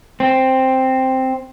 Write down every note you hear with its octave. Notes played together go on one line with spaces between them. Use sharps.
C4